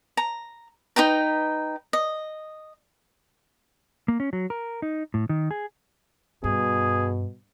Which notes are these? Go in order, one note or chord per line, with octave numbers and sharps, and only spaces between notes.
A#5
D#4 B4 G5 A#5
D#5
A#3
C#4
F#3
A#4
D#4
A2
D#3
G#4
G2 B2 G#4